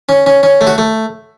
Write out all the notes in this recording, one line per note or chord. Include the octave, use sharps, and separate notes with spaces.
C#4
C#4
C#4
A3
F#4
A3